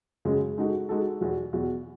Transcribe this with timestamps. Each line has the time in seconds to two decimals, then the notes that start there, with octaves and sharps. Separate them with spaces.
0.25 F#2 C#3 G#3
0.58 G#3 D#4 F#4 A4
0.89 G#3 D#4 F#4 A4
1.21 E2 B2 F#3
1.53 E2 B2 F#3